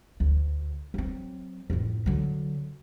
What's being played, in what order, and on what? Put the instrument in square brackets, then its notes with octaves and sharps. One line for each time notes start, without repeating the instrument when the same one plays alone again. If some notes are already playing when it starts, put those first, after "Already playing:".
[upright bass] D2
F#3 C4
F2 A2
D3 F#3